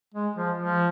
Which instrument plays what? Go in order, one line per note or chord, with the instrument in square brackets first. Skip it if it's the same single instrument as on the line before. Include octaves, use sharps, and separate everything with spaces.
[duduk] G#3
F3
F3